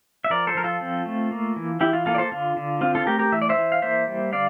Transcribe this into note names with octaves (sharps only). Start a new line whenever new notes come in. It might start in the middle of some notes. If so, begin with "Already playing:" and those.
E5
F3 A#4 D5
A4 C5
F3 A#4
F4 A4
C4
A3
A#3
E3
E3 E4 G4
F4
A#3 F4 A4
D5
A4 C5
D3 F4
D3
C4 F4
F4 A4
A3 G4 A#4
G4 A#4
E3 E5
D5
C5 E5
E3
F5
A#3 C5 E5
G3
D3 D5 F5